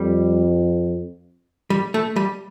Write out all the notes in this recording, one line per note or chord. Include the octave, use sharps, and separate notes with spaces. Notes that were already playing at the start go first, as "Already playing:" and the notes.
Already playing: F2 G3
G3
A3
G3